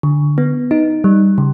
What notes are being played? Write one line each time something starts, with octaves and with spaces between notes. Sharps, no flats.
D3
B3
D#4
G3
C#3